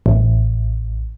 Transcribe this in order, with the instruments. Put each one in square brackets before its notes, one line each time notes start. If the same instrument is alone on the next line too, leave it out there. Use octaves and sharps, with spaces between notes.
[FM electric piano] A1